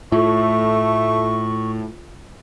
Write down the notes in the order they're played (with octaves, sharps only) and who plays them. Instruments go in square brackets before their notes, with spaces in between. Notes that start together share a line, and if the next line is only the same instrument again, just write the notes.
[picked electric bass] A2 [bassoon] A3 [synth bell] F4 [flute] C#6